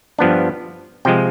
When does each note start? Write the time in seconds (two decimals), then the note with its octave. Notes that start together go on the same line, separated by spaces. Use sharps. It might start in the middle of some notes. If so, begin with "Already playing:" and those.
0.19 G2 F3 B3 D4
1.05 C3 F3 G#3 G5